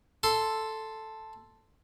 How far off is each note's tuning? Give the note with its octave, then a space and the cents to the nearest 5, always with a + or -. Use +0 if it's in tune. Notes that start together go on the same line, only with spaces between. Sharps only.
A4 +0 C6 +0